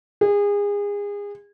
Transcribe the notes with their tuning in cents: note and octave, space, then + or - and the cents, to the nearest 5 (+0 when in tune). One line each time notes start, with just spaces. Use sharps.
G#4 -30